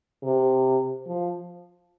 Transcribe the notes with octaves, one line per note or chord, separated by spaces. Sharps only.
C3
F3